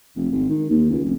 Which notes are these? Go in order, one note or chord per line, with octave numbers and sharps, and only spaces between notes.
F1
G#1
D#3
D#2
C#2
F1